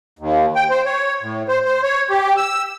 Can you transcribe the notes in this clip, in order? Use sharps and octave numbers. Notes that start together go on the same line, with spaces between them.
D#2
G5
C5
C#5
A2
C5
C5
C#5
G4
E6